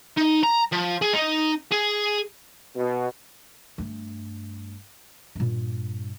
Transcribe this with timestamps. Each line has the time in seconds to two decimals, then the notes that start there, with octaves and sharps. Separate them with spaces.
0.17 D#4
0.44 A#5
0.72 F3
1.02 G#4
1.13 D#4
1.72 G#4
2.75 B2
3.78 G2 A3
5.35 G2 A#2